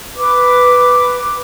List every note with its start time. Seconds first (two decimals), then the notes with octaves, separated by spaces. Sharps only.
0.16 B4 D6